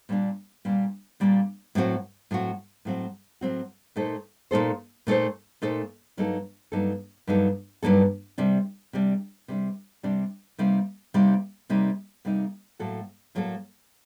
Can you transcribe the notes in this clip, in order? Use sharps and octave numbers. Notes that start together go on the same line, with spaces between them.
A#2 G3 A#3 D4
A#2 G3 A#3 D4
A#2 G3 A#3 D4
A2 F#3 C4 F#4
A2 F#3 C4 F#4
A2 F#3 C4 F#4
A2 F#3 C4 F#4
A#2 A3 D#4 A4 C5
A#2 A3 D#4 A4 C5
A#2 A3 D#4 A4 C5
A#2 A3 D#4 A4 C5
G2 F#3 A#3 D#4 A4
G2 F#3 A#3 D#4 A4
G2 F#3 A#3 D#4 A4
G2 F#3 A#3 D#4 A4
C3 G3 D4
C3 G3 D4
C3 G3 D4
C3 G3 D4
C3 G3 A#3 D#4
C3 G3 A#3 D#4
C3 G3 A#3 D#4
C3 G3 A#3 D#4
A2 F#3 A#3 F#4 A4
A2 F#3 A#3 F#4 A4